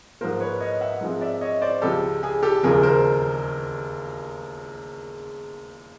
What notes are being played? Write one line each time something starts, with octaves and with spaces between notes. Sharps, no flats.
G#2 F3 A#3 A#4 C5
B4 C#5
C#5 D#5
E5 F#5
G#2 F3 G#3 C4
D5 E5
C#5 D#5
C5 D5
C#2 C#3 F3 G4 A4
G#4
G4 A4
E1 D#2 C#3 F3 G#4 A#4
A#4 C5